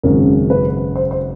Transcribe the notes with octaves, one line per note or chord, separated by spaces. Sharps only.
G#1 F#2 C#3 A#4
B4
C5
C5